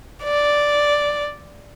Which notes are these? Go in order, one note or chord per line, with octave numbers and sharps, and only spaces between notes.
D5